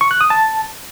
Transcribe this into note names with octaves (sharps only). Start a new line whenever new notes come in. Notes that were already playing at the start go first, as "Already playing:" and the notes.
C#6
F#6
D#6
A5